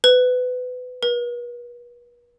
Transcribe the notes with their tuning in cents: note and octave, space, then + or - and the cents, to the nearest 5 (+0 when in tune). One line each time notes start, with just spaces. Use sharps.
B4 +25
B4 -40